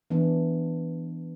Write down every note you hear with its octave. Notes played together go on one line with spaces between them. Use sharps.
E3 B3 D4